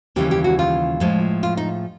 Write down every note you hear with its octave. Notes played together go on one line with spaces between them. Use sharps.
D#2 C#3 E3 G3 G4
G4
F#4
F4
A2 F3 G#3
F4
D#4